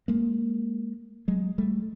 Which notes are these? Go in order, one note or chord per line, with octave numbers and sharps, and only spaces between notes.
G#3 A#3
F#3 G#3
G3 A3